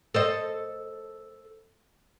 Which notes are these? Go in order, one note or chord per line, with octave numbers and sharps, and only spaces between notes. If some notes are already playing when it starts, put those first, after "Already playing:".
A4 C5 D#5